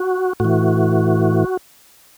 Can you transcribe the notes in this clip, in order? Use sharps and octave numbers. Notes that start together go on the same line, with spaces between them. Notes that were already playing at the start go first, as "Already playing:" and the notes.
Already playing: F#4
A2 E3 F#4